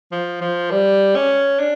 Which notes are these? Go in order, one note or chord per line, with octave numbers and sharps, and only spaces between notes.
F3
F3
G3
C#4
D4